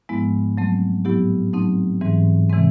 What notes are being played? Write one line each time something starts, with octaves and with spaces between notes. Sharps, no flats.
G#2 F3 G#3 B3 E4
F#3 A3 C4
A2 F#3 B3 E4 G4
F#3 A3 C4 D#4
G#2 E3 G3 C4
C3 E3 G#3 C4